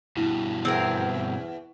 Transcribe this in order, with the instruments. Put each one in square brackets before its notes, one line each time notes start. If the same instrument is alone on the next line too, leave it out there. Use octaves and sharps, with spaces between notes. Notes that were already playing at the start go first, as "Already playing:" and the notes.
[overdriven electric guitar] G2 B2 [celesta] E4
[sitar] E2 [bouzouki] C4 G#4 A#4